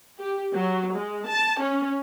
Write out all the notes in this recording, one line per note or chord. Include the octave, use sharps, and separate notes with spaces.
G4
F#3
G#3
A5
C#4